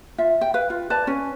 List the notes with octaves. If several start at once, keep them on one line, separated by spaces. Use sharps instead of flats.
F4 E5
G5
B4 F5
F4
B4 D5 A5
C#4 G#5